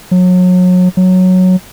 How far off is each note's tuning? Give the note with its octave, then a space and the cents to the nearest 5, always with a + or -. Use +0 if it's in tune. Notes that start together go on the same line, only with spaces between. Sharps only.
F#3 -30
F#3 -5